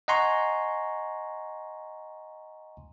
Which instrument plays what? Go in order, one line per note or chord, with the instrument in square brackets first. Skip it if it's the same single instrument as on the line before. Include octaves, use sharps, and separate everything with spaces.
[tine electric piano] D#5 F#5 G#5 A#5 C6 C#6